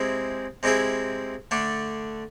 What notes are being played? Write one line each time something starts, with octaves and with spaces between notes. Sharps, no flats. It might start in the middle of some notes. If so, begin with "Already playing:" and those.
Already playing: C3 G#3 C4 E4 G#4
C3 G#3 C4 E4 G#4
D3 A3 D4